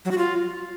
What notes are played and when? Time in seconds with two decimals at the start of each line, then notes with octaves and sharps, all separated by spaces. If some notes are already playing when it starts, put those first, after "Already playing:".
0.05 F#3
0.11 F#4
0.18 F4